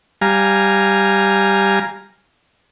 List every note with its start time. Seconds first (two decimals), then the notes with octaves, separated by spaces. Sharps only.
0.22 G3 F5 G#5 A#5